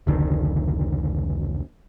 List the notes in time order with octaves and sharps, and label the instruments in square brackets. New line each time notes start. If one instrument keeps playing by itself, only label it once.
[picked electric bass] F1 C#2 D3 D#3